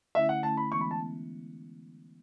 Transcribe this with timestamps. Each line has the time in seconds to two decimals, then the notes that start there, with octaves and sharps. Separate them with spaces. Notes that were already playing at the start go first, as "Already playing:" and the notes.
0.15 D3 A3 C#4 E4 E5
0.29 F#5
0.43 D3 A3 C#4 E4 A5
0.57 B5
0.72 E3 G#3 B3 C#6
0.81 B5
0.91 A5
1.00 B3